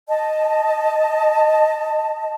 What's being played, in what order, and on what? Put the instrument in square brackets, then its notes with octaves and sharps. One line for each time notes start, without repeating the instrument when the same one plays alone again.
[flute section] D#5 A5